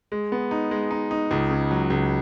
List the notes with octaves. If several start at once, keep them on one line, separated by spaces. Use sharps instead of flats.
G#3
B3
D#4
G#3
D#4
D#4
C#2
C#3
F#3
C#2